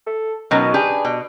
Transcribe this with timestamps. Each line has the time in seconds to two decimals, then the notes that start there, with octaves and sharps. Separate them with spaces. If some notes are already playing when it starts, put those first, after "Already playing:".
0.06 A4
0.51 B2 D#3 F#3 C#4
0.74 D4 G4 G#4 B4
1.05 B2